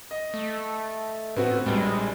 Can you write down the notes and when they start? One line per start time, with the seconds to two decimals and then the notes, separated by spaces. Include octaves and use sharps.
0.11 D#5
0.34 A3
1.37 A2 B3 C4 F#4
1.66 A#1 G3 G#3 G5